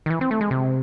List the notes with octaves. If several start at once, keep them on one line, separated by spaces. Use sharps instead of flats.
D#3
E3
C4
A3
G#3
C3